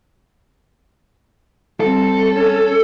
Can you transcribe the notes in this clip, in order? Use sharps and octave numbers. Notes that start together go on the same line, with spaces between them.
G3 C4 A4
C#4